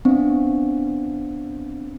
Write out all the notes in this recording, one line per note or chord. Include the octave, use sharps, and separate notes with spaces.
B3 C4 D4